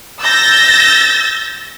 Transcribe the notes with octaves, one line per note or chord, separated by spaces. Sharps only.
E6 G6 A6 A#6